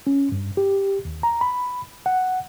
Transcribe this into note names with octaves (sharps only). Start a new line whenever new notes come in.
C#4
G2
G4
D#2
A#5
B5
F#5